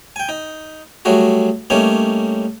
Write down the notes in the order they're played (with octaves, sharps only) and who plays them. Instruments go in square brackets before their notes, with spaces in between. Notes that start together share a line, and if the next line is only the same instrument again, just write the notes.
[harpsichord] G5 G#5
D#4
F#3 G3 A3 F#4 G#4
G3 A3 A#3 C#4 D#4 C#5